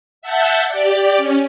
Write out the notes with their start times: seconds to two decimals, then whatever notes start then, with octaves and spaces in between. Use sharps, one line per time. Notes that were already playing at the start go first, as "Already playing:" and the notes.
0.22 E5 F#5 A5 G6
0.68 G4 D5
1.17 C#4